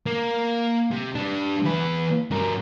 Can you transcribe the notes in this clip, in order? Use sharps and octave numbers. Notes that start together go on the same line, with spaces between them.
A#3
C3
G3 D4
E2 B4
G2 A#4